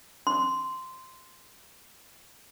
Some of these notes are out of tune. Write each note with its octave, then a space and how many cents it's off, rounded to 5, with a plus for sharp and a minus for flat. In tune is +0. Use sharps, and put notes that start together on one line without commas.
C6 -10